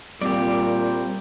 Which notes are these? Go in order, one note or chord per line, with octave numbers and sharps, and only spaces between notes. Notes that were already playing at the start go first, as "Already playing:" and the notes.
A#2 G3 C4 G4 D5